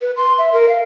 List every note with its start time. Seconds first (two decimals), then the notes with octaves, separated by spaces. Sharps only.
0.02 B4
0.17 C6
0.38 E5
0.52 A#4
0.69 F5